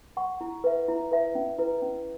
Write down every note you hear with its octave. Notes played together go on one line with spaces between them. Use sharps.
F#5 C#6
E4
B4 E5
E4
B4 E5
C#4
E4 B4
C#4